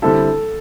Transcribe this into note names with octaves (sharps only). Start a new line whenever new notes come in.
D3 G3 C4 E4 A4